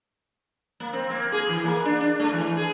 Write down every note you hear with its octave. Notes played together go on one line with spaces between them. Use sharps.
A#3
C4
A#3
G#4
E3
A#3
D4
D4
A3
E3
G#4